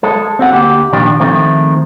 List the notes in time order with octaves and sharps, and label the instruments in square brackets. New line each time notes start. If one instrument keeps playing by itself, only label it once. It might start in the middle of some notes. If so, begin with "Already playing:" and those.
[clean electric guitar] G#3 A4
C4 F#4 F#5
D2 A#3 G4
A#2 D#3 F3 D4 G4
D#3 F3 G#3 A3 C4